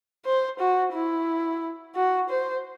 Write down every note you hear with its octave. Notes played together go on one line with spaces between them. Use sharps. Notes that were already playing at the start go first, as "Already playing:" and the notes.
C5
F#4
E4
F#4
C5